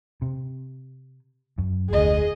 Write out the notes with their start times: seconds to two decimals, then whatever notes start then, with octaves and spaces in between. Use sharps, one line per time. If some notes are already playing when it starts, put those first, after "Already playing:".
0.22 C3
1.58 F#2
1.90 F1 D2 G#4 D#5